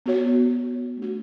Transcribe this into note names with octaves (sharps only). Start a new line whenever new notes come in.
B3 F#4 C#5
A3 D4 F#4